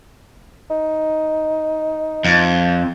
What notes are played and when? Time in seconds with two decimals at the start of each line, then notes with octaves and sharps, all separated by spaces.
0.70 D#4
2.25 F2